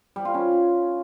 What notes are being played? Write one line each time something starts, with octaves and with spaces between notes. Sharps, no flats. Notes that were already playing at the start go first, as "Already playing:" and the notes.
G3
F4
C#4